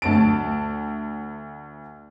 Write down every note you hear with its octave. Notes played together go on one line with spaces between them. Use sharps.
D2 A5 D7